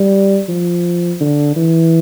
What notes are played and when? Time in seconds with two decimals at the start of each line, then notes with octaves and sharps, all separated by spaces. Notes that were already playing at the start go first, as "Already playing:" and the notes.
Already playing: G3
0.48 F3
1.20 D3
1.56 E3